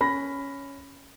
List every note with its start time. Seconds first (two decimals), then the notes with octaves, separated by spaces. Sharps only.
0.01 C#4 B5 A#6